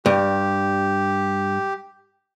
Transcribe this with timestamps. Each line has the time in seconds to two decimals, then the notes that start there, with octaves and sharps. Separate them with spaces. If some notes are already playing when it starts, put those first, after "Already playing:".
0.06 G2 G4